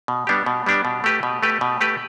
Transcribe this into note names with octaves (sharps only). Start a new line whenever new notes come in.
B2
G3 B3 D4 G4
B2
G3 B3 D4 G4
B2
A3 G4 B4
B2
A3 G4 B4
B2
A3 G4 B4